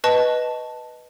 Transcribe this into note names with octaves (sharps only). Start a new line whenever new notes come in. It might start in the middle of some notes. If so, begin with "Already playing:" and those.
B4 D#5 A5 C#6